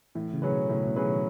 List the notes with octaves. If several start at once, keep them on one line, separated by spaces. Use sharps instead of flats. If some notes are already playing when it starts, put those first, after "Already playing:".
A2 E3
C#3
F#3 C#4 G#4 B4
B2
A2 C#3
B2
F#3 C#4 G#4 B4
D#3